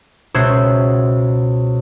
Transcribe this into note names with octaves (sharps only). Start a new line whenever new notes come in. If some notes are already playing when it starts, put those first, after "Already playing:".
C#2 B2 F#4 C5 E5 G#6